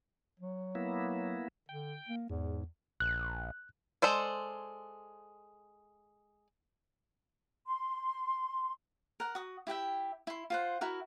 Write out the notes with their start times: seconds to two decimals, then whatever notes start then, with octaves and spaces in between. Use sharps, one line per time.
0.40 F#3
0.75 A#3 B3 E4
1.69 D3 G5
2.09 A#3
2.30 E2 G#2
3.00 A#1 F#6
4.02 G#3 A4 C5 D5
7.67 C6
9.20 A#4 F#5
9.35 F#4 D#6
9.67 E4 G4 E5 G5
10.27 E4 C6
10.50 F4 C5 F#5
10.81 E4 F#4 A#4